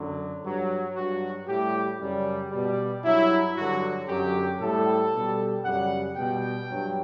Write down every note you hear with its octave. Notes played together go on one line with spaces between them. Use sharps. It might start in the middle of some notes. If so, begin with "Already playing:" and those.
Already playing: F#2 D3 F#3
G2 F#3
G2 F#3 F#4
A2 G3 G4
F#2 C#3 G3
B2 G3
G2 F#3 E4
G2 D3 F#3 F#4
F#2 D3 F#3 G4
A2 G3 A4
B2 G3
F#2 C#3 G3 F#5
B2 G3 G5
G2 F#3